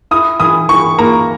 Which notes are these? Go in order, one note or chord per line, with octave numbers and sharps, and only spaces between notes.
E4 D#6
E3 D#6
E3 C#6
A#3 A#5